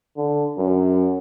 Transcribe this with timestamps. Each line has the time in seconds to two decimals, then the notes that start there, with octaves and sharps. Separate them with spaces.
0.17 D3
0.58 F#2